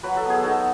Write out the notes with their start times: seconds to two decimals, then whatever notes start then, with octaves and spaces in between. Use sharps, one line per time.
0.03 F#3 B4
0.17 A4
0.25 B3
0.30 G#4
0.43 D#4 F#4 A4